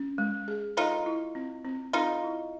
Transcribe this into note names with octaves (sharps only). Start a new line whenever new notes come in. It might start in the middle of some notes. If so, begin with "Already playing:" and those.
Already playing: C#4
G#3
G#4
D#4 F4 A4
E4
C4
C4
D#4 F4 A4
E4